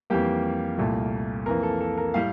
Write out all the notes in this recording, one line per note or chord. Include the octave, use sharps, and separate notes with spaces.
F2 E3 G3 A#3 G4
C2 A#2 A3
F2 E3 A#3 A#4
A4
A4
A#4
A2 G3 F5